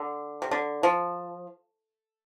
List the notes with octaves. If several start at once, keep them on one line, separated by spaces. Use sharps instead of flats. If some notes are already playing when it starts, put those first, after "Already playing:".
Already playing: D3
C3
D3
F3